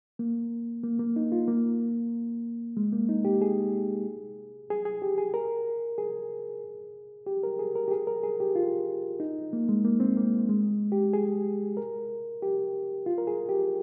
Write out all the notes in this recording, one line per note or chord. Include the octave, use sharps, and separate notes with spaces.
A#3
A#3
A#3
D#4
F4
A#3
G#3
A#3
D#4
G4
G#4
G#4
G#4
G4
G#4
A#4
G#4
G4
A#4
G#4
A#4
G4
G#4
A#4
G#4
G4
F4
D#4
A#3
G#3
A#3
C4
A#3
G#3
G4
G#4
A#4
G4
F4
A#4
G#4
G4